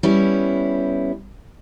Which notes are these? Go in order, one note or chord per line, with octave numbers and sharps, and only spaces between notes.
G3 B3 C#4 E4